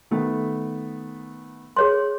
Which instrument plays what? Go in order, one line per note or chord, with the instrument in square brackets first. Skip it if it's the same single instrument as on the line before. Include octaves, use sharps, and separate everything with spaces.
[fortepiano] D#3 A3 B3
[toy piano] G#4 C#5 C6